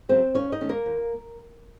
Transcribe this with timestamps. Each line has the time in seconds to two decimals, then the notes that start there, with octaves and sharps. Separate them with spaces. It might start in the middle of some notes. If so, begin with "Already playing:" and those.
0.09 C#3 F#3 C4 C5
0.34 D#2 C#4 C#5
0.52 D#4 D#5
0.61 D#3 A3 C#4
0.69 A#3 A#4
0.86 D#2